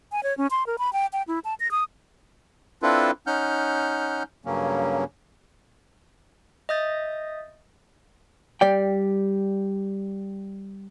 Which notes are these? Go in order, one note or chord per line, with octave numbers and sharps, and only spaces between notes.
G#5
C#5
C#4
C6
A#4
B5
G5
G5
E4
A5
A#6
D#6
C4 D4 E4 F4 A4 B4
C#4 D#4 F#5 F6 G6
G2 C#3 F#3 A#3 C#4
D#5 E5 D#6 G6 A6
G3 D5 G5